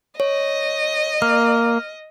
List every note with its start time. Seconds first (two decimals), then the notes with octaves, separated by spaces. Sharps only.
0.20 C#5 D#5
1.22 A#3 F6